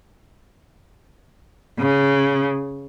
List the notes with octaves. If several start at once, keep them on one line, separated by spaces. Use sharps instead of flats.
C#3